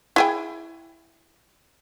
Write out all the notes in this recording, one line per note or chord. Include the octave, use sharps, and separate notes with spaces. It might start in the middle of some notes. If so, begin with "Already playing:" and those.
E4 G#4 G5